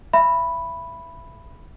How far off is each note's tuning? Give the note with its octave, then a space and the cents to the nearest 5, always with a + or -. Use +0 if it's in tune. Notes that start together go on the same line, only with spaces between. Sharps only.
E5 +25 B5 +0